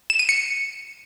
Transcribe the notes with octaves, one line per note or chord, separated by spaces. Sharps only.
E7
D#7
C#7